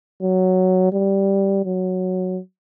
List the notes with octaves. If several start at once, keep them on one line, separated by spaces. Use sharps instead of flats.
F#3
G3
F#3